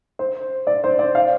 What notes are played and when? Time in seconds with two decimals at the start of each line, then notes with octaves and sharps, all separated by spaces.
0.19 C5
0.67 D5
0.84 C5
0.99 D5
1.15 F5